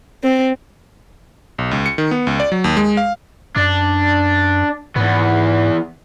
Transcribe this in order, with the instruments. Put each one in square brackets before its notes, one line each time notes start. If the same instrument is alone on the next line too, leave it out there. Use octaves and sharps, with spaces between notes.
[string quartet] C4
[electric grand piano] B1
C#2
C#7
D#3
B3
C#2
D5
F#3
D#2
G#3
F5
[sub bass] F#2 [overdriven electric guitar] D4
[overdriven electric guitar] E2 B3 [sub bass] G#2